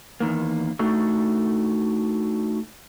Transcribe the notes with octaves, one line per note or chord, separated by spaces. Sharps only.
E2 D#3 A#3
A3 D4 D#4 F#4 A4